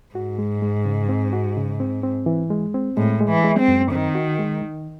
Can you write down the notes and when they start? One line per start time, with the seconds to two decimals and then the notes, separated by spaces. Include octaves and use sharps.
0.15 G#2 F#4
0.39 G#3
0.62 G#3
0.85 C#3
1.09 C4
1.33 F#4
1.57 C#3
1.80 C4
2.03 C4
2.26 E3
2.50 G#3
2.74 C4
2.97 A2 G#3
3.20 G#3
3.29 E3
3.44 G#3
3.60 C4
3.68 F#2
3.92 D#3 C4
4.15 F#4
4.39 G#3
4.62 D#3